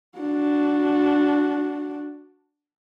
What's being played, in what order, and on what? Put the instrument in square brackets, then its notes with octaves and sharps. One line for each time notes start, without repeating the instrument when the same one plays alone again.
[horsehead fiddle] D4 F#4